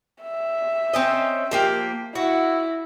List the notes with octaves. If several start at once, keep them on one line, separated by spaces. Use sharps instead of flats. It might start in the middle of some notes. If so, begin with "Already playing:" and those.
E5
C4 C#4 D#5
F3 A#3 G4
E4 F#4